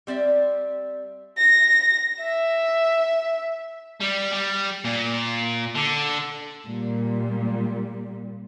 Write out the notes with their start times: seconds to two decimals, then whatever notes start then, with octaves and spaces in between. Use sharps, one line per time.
0.07 G3 C4 D5 E5
1.39 A#6
2.23 E5
4.00 G3
4.32 G3
4.85 A#2
5.75 D3
6.64 A#2 G3